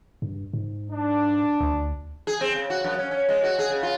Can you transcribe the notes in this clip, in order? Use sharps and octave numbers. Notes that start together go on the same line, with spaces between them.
G2
G#2
D4
D2
G#4
C4
C#3
F#4
F#2
C#4
C#4
G#3
F#4
G#4
C#3
F4